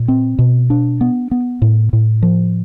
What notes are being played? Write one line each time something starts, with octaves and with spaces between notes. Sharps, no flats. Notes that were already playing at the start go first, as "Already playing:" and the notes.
Already playing: A#2
C4
B2
D4
B3
B3
A2
A2
F3